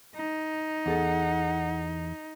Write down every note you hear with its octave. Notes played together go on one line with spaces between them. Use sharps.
D#4
E2 G#4 A4 F#5